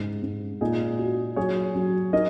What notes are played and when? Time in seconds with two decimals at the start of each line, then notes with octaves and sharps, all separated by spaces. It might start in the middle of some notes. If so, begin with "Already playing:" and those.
Already playing: G#2 C#3
0.23 G#2
0.61 A#2 D#4 G#4
0.98 F#4
1.36 F#3 G#4 C#5
1.75 F#3
2.13 D#4 A#4 D#5